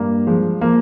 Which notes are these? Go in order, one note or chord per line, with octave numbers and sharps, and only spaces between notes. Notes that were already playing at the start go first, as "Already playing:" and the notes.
Already playing: G2 A#3
F3 G#3
F3 A#3